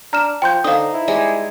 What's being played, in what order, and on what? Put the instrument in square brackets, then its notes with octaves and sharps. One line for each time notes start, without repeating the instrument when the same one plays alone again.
[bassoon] D4 [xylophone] A#5 F6 E7
[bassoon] F3 [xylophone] G5 C6 G6
[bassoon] D3 [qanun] D#4 C5 [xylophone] F5 D#6
[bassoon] E4
[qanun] G3 G#3 G#4